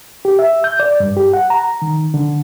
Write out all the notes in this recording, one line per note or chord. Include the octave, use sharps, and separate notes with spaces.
G4
E5
G6
D5
G2
G4
F#5
A#5
D#3
D3